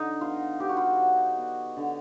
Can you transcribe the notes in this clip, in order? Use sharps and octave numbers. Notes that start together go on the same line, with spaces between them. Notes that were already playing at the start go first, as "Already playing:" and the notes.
Already playing: D3 D#4
B3 F4
B3 G4
F#4
F4
F#4
F#3
B3
D3